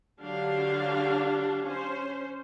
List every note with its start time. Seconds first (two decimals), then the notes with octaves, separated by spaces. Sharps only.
0.21 D3 F#3 D4 G4 F5
1.65 C#4 C5